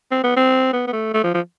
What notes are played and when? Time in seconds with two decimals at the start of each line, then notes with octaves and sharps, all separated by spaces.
0.11 C4
0.24 B3
0.37 C4
0.73 B3
0.87 B3
0.93 A3
1.14 A3
1.24 F3
1.34 F3